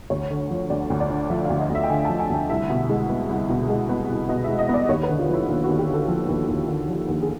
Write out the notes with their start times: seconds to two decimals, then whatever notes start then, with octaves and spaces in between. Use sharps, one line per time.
0.10 D2 C#5
0.30 D3
0.50 F3
0.70 D2 D5
0.90 D2
1.00 D5
1.10 D3
1.30 F3 E5
1.45 F5
1.50 D2
1.60 D#5
1.70 D2
1.75 E5
1.83 G5
1.90 D3 G#5
2.05 A5
2.09 F3
2.20 G#5
2.30 D2 G5
2.50 C2 E5
2.70 B2
2.89 G#3
3.10 B3
3.29 C2
3.49 B2
3.69 G#3
3.89 B3
4.09 C2
4.29 B2 D#5
4.44 E5
4.49 G#3
4.59 D#5
4.69 B3
4.74 D5
4.89 D#2 C#5
5.03 B4
5.09 D3
5.19 F4
5.29 F3 E4
5.48 D#2 F4
5.63 F#4
5.68 D#2
5.79 G4
5.88 D3
5.94 A4
6.08 F3
6.28 D#2
6.48 D#2
6.68 D3
6.88 F3
7.08 D#2
7.22 G#4